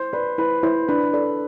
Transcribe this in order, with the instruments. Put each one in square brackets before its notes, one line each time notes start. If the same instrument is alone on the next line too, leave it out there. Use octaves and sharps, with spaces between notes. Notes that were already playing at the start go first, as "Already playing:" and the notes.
Already playing: [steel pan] E4 [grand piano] C5
[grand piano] B4 [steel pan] D5
[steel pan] E4 [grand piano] B4
[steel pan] E4 [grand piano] C5
[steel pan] D4 [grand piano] B4
[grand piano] A4 [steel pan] D5